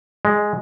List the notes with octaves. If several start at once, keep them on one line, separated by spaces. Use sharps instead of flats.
G#3